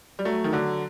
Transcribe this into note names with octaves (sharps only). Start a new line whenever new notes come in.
G3
F#3 A3
D#3
D3 F#3